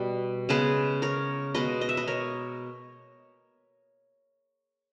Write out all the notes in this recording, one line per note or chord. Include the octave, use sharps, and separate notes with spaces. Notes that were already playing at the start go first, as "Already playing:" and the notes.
Already playing: B2 G3
C#3 G#3 B3 G#4 B4
A#4 C#5
B2 G#3 B3 B4 D#5
D#5
E5
B4 D#5
A#4 C#5